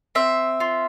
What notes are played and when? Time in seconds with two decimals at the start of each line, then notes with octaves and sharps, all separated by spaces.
0.15 C4 E5
0.60 F4